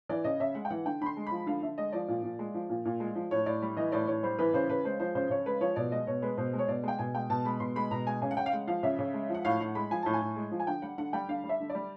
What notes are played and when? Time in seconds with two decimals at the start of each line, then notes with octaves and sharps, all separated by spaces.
0.09 E3 D5
0.24 C#3 D#5
0.40 C#3 E5
0.55 G#3 F#5
0.65 G5
0.70 E3 F#5
0.85 D3 G5
1.01 D3 B5
1.06 C6
1.17 G#3
1.27 F3 B5
1.46 D3 F5
1.62 D3 E5
1.78 G#3 D#5
1.93 F3 D5
2.08 A#2
2.23 A#2
2.39 G#3
2.54 F3
2.69 A#2
2.85 A#2
3.00 G#3
3.15 F3
3.31 A2 C#5
3.46 A2 D5
3.62 G3
3.77 E3 D#5
3.92 A2 D5
4.07 A2 C#5
4.23 G3 C5
4.39 E3 B4
4.53 C#3 C5
4.69 C#3 B4
4.85 G#3 C5
5.00 F3 C5
5.15 C#3 C5
5.30 C#3 C#5
5.46 G#3 B4
5.61 F3 C#5
5.76 B2 D5
5.92 G#3 D#5
6.07 B2 C#5
6.22 G#3 B4
6.37 B2 C5
6.53 G#3
6.59 C#5
6.68 B2 D5
6.83 G#3 G5
6.99 B2 G#5
7.15 G#3 G5
7.30 B2 A5
7.45 G#3 B5
7.60 B2 C6
7.76 G#3 B5
7.91 B2 A#5
8.07 G#3 G#5
8.22 C#3 G#5
8.31 F#5
8.37 C#3 G5
8.46 F5
8.53 G#3 F#5
8.67 F3 F5
8.83 C#3 E5
8.99 C#3
9.14 G#3
9.29 F3
9.34 F#5
9.45 A2 F5
9.60 A2 F#5
9.75 G#3 B5
9.91 F3 G#5
10.02 A2 A5
10.14 G#5
10.22 A2
10.36 G#3
10.51 F3
10.60 G#5
10.67 D3 G5
10.82 G3 F#5
10.98 D3 F#5
11.13 G3 G5
11.28 D3 F5
11.44 G3
11.49 E5
11.60 D3
11.70 D5
11.75 G3